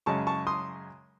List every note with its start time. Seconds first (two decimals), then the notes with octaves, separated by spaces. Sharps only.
0.06 F#2 C#3 G#3 A5 C#6
0.27 A5 C#6
0.47 C6 D#6